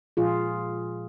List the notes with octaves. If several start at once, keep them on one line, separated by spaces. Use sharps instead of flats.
A#2 F3 G#3 F4 G#4